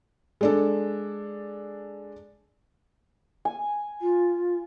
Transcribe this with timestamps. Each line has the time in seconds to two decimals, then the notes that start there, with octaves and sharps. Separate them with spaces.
0.41 G#3 D4 A4
3.45 G#5
4.01 F4